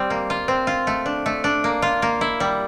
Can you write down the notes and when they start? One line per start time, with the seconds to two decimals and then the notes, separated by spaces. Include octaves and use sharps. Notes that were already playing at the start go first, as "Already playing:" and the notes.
Already playing: G3 C4
0.10 A#3
0.30 F4
0.48 C4
0.67 F4
0.87 A3
1.06 D4
1.26 A3
1.44 D4
1.64 A#3
1.82 F4
2.02 A#3
2.21 E4
2.40 G3